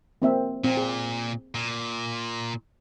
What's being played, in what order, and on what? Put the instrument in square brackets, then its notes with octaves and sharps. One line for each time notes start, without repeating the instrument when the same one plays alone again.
[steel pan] A#3 C4 E5
[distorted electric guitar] A#2 [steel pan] C4
[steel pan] G#4
[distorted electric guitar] A#2